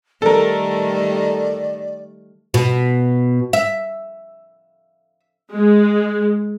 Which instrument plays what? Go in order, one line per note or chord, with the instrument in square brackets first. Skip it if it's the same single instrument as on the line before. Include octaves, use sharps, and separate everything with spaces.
[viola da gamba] D#3 G3 A3 [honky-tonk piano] A4 A#4 [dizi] D5
[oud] B2
E5
[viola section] G#3